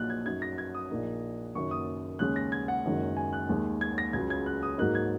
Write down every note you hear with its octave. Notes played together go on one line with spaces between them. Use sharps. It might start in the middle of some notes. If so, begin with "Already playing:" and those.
Already playing: A#1 A#2 F#3 D#4 F#6
G#6
F#2 F#3 D#4 G#6
A#6
G#6
D#6
A#1 A#2 A#3 D#4
F#1 F#2 D#3 A#3 C#6
D#6
D#2 C#3 G#3 C#4 F#6
A#6
G#6
F#5
F#1 F#2 D#3 G#3
G#5
F#6
D#2 D#3 G#3
G#6
A#6
C#2 C#3 F#3 G#6
G#6
F#6
D#6
G#2 F#3 A#3 D#4 F#6
G#6